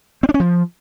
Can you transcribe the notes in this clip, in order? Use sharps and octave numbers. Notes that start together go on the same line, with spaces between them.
C4
D4
C#4
F3